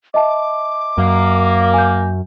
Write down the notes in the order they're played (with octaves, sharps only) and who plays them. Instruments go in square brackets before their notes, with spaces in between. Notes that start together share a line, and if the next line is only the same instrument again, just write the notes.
[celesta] D#5 E5 A5 [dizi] D6
[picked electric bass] F#2 [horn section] A#3
[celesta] G#5 G6